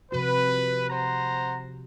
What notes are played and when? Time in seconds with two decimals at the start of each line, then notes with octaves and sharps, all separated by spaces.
0.12 C3 F3 F#4 B4
0.90 C5 F#5 A#5